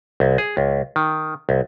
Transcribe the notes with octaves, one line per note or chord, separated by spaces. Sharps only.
C2
G#4
C#2
D#3
C2